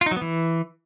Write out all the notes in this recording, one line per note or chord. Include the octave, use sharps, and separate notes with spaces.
F4
D#4
F#3
B3
E3